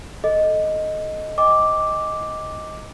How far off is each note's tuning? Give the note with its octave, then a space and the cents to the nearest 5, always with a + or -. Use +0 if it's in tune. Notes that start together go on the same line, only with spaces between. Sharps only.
A4 +0 D#5 +0
D#5 +5 G5 +35 D6 +0